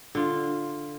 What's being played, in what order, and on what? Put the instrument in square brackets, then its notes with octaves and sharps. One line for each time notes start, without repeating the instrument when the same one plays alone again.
[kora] D3 F4